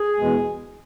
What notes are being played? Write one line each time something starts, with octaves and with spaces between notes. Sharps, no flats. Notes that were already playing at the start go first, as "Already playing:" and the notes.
Already playing: G#4
E2 B2 G#3